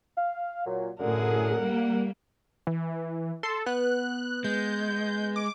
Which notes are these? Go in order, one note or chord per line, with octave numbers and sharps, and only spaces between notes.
F5
A#2 F#3
F#2 A2 D3 G#4 A#4 F#5
G3 A#3
E3
A4 C6 C7
B3 F#6
G#3 G6
D6